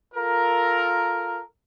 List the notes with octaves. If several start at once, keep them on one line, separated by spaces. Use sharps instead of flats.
F4 A4 A#4